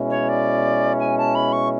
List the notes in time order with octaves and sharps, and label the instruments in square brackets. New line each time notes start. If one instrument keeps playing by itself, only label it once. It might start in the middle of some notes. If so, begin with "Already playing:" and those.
Already playing: [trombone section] B2 G#3 C#4 E4
[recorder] C#5
D5
G#5
A5
B5
C#6